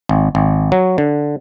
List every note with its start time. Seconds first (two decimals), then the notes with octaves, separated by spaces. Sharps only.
0.09 G#1
0.35 G#1
0.72 F#3
0.98 D3